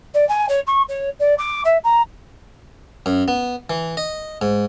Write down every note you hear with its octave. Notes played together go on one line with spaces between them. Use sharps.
D5
G#5
C#5
C#6
C#5
D5
D6
E5
A#5
F#2
B3
E3
D#5
G#2